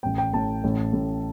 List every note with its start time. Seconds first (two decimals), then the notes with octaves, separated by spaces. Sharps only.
0.03 A1 A2 G5
0.18 G5
0.33 A1 A2 A5
0.64 A1 A2
0.93 A1 A2